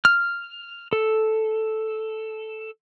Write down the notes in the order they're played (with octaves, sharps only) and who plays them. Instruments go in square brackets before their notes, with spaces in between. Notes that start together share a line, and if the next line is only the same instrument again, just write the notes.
[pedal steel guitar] F6
A4